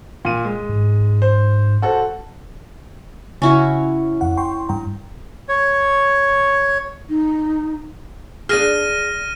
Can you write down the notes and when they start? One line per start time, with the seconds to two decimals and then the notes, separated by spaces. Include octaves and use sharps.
0.25 A#2 D#7
0.45 G#3
0.69 G#2
1.22 C5
1.82 F#4 A4 C5
3.42 C#3 C#4 E4 F#4
4.21 F2 F#5
4.37 G5 C6 C#6
4.69 G2 G5 A#5
5.49 C#5
7.08 D#4
8.49 D4 G#4 F6 A#6 D#7